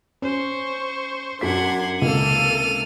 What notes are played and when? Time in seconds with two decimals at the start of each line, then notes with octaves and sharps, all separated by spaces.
0.22 C#4 C5 C#6
1.41 F#2 D4 F#5 C6 G#6 B6
2.02 C#2 C3 D#3 A#3 A4 F6 D#7